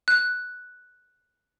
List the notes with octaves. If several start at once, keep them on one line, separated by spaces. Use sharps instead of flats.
F#6